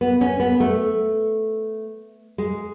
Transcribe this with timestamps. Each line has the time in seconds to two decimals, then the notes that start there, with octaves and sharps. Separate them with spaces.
0.01 B3
0.21 C#4
0.40 B3
0.60 A3
2.38 G#3